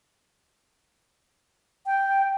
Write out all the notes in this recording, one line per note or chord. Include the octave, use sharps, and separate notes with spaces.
G5